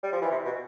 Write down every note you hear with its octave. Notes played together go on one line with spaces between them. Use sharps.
G3
F3
E3
C3
B2